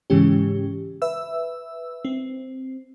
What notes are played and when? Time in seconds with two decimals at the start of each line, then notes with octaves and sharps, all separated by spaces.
0.10 G#2 C#3 E3 G#3 C#4 G4
1.02 B4 E5 E6
2.05 C4